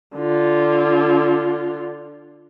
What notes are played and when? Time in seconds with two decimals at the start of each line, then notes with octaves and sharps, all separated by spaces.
0.16 D3 F4